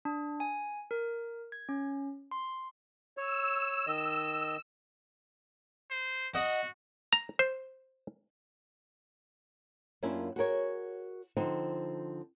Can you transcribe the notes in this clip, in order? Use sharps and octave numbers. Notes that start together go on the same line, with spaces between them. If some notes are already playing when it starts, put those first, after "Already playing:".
D4
G#5
A#4
G#6
C#4
C6
C#5 E6
D#3 D#5
C5
F#4 D#5 F#5
A#5
C5
F#2 A#3 C#4 D4 E4 F4
F#4 G#4 A#4 C#5
D3 F3 C4 D#4